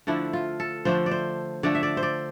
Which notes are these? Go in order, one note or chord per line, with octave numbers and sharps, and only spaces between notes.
D3 F3 A3 D4 E4
F4
A4
D3 F3 A3 D4 C5
D5
C5
D3 F3 A3 D4 D5
E5
D5
C5
D5